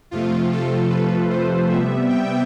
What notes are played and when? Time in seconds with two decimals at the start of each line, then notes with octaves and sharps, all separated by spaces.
0.11 F2 C3 F3 A3 F4
0.52 A4
0.90 B4
1.30 C5
1.69 C3 G3 B3 E5
2.09 G5